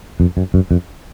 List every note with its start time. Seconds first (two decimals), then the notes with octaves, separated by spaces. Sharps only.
0.20 F2
0.37 F#2
0.54 F#2
0.71 F2